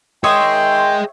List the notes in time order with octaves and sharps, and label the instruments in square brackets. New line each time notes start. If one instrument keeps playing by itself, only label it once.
[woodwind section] D#3 C6 [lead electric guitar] G#4 D#5 [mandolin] C#5 E5 D#6 [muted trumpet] G5